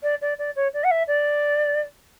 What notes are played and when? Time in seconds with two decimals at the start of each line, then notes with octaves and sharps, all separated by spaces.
0.03 D5
0.22 D5
0.39 D5
0.56 C#5
0.74 D5
0.84 F#5
0.91 E5
1.08 D5